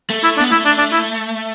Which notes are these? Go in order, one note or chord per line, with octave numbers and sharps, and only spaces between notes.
A3
E4
D4
B3
A3 E4
D4
D4
E4